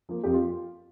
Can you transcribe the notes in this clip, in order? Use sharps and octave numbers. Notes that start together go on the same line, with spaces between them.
F3 A#3
F2 G4
F4